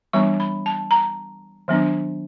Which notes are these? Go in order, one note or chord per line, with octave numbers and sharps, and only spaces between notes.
E3 G3 B3 D4 C#6
B5
A5
A#5
D#3 F#3 B3 D4